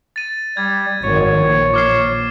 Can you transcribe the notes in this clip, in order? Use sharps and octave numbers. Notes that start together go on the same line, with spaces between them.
A6 D#7
G3 G#6
G#1 D#3 C#5
A#1
D6 F6 C7